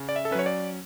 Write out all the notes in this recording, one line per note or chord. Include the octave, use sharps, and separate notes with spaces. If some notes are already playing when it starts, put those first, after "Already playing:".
Already playing: C#3
D5
E5
A4
F#3 C#4 B4 C#5
D5